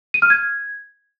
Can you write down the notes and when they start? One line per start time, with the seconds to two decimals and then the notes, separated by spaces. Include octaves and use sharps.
0.14 D#7
0.22 F6
0.30 G#6